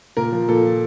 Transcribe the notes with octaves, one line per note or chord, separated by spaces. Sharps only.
A#2 A#4
F3
A#2 A4
F3